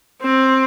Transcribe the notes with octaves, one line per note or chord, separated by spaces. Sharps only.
C4